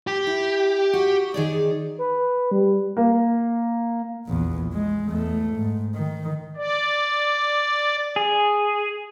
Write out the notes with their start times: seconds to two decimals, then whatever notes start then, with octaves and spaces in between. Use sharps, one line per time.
0.07 G4
0.27 E4
0.93 F#4
1.34 D#3 G#4 D5
1.98 B4
2.51 G3
2.97 A#3
4.27 A#1 E2
4.73 G#3
5.07 E2 A3
5.55 G#2
5.95 D#3
6.56 D5
8.16 G#4